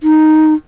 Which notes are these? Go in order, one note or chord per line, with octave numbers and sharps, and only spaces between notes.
D#4